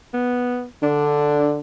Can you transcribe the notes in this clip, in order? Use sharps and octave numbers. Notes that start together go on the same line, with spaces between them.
B3
D3 D4